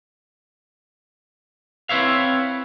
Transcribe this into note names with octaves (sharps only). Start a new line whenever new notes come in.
C4 E4 B4 C#5 E5 F5